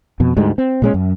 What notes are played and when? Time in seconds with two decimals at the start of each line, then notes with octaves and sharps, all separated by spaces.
0.20 F2 B2
0.37 D2 G#2 G3 G#3
0.58 C4
0.82 A#2 G#3 C#4
0.94 F#2